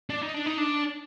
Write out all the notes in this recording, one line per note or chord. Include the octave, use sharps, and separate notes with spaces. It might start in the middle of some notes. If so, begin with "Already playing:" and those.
D4
D#4
D4
D#4
D4